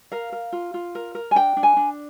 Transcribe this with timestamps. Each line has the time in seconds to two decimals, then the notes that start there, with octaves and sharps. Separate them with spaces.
0.12 A#4 F5
0.32 A#4
0.52 F4
0.74 F4
0.95 A#4
1.15 A#4
1.31 G#5
1.35 D4 G5
1.57 D4
1.63 G#5
1.77 D4